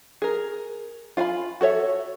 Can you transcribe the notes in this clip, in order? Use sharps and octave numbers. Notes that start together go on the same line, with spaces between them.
G#4 A#4
F4 F5 G#5 B5
F#4 A4 C#5 E5